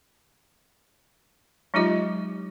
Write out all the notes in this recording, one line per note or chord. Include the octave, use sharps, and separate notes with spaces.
F#3 G#3 D#4 F4 G4 D#5